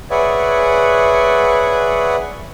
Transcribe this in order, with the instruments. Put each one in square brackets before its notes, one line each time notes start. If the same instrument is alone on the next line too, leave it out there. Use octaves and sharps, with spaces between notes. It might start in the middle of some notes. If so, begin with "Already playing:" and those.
[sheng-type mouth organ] G#4 B4 C#5 D5 E5 F#5